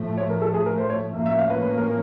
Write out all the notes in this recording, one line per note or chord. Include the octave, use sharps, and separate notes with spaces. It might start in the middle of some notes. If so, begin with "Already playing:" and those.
Already playing: A2 F3 A3
C#5
A#4
A4
G#4
A#4
C5
C#5
A2 F3 A#3 C#4 E5
E5
F5
B4
B4
A#4